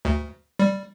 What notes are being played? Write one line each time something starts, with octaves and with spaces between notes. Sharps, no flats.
D2
G3